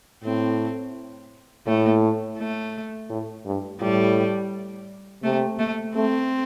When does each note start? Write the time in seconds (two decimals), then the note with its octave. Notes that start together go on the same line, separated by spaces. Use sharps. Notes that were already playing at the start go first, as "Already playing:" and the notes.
0.24 A2 C4
1.67 A2 A3
2.38 A3
3.10 A2
3.46 G2
3.81 A2 G3
5.23 C3 A3
5.59 A3
5.95 A3 C4